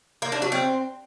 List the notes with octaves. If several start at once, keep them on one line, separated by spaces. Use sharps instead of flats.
A#3
D4
F#3
C4